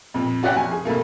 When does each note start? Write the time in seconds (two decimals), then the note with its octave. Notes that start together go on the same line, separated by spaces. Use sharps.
0.14 F2 A#2
0.43 C#4 F#4 D5 E5 F#5 G5
0.56 F1 G#5
0.71 G#4
0.85 F2 C3 A3 A#3